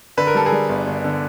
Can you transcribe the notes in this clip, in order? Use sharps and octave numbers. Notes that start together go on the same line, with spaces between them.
D3 B4
A#4
G3 A4
G#4 A#4
G3
G1
G1
D3